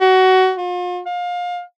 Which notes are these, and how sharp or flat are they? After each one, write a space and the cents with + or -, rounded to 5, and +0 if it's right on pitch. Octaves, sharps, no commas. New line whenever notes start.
F#4 +20
F4 +40
F5 +25